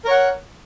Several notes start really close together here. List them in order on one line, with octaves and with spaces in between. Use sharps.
A#4 C#5 F#5